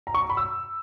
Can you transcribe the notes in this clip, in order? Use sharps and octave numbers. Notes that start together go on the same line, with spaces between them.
A#5
C#6
A#5
B5
E6